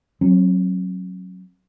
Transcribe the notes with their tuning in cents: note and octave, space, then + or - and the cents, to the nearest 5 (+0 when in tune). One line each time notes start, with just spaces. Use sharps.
F#3 +0 C4 +45